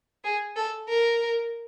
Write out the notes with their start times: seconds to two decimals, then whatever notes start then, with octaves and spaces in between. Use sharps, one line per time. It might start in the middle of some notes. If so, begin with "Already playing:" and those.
0.24 G#4
0.56 A4
0.89 A#4